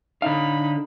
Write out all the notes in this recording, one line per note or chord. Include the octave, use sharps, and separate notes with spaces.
D3 D#4 F5 B5